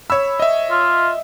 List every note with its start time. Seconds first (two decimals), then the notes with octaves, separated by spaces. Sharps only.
0.10 C#5 B5 E6
0.40 D#5 E5
0.71 F4